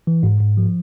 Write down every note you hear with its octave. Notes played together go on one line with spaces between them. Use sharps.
E3
G#2
G#2
F3